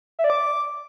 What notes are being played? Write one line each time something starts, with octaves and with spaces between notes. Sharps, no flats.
E5
D5
D6